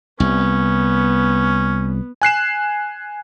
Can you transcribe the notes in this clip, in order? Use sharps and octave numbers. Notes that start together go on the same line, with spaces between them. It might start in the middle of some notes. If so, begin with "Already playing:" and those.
C2 B3 C#4
G#5 F#6 C7 E7